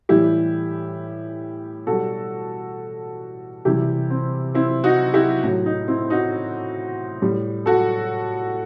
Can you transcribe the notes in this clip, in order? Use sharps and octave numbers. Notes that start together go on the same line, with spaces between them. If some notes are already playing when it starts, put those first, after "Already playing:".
A2 E3 G3 E4 G4
B2 G3 F#4 A4
C3 E3 G3 E4 G4
C4
C4 E4
D#4 F#4
E4 G4
A2 F#3
D#4
C4 E4
D#4 F#4
A2 G3
F#4 A4